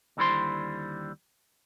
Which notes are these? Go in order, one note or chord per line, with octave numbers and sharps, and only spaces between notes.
D#2 D3 G3 E4 C5 C6